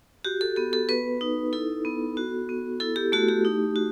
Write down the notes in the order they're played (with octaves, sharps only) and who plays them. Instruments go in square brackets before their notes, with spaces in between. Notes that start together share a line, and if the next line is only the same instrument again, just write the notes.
[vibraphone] F#4 G4
A4
B3 A4
A4
B3 B4
D#4
E4 A4
B3
F#4
B3
E4 A4
G4
A3 F#4
G4
D#4
F#4